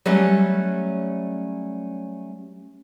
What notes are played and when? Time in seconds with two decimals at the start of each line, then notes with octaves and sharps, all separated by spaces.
0.06 F#3 G3 A3 C#4